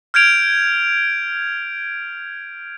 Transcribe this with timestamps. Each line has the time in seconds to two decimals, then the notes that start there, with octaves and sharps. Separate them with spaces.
0.14 F6 G6 G#6 D7 F7